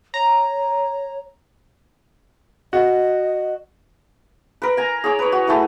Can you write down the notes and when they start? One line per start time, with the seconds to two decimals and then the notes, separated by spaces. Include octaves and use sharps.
0.14 C#5 A#5
2.73 F#4 D#5
4.62 A#4 B4
4.77 G#5 A#5
5.04 G#4 C#5 D6
5.19 B4 C#5
5.32 F#4
5.47 A3 E4 G#4